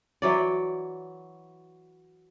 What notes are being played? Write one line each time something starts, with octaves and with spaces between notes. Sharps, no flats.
E3 F#3 D5